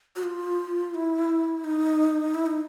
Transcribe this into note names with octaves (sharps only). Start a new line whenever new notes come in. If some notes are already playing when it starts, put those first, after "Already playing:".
F#4
F4
E4
D#4
E4
D#4